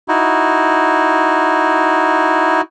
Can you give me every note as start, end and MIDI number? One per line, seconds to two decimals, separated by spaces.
0.08 2.61 63
0.08 2.61 64
0.08 2.61 66